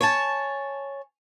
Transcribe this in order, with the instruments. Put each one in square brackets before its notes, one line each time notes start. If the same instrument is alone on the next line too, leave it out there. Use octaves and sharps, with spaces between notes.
[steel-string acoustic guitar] C#5 G#5 A5